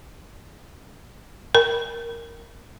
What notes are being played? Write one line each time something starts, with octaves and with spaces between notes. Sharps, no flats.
A#4